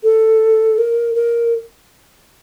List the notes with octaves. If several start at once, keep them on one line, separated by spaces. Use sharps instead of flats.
A4
A#4
A#4